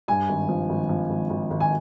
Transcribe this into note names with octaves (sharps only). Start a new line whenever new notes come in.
G2 G#5
G#1
F3
G#1
F3
G#1
G#1
G#1
G#5